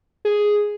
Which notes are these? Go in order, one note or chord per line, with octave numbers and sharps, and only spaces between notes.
G#4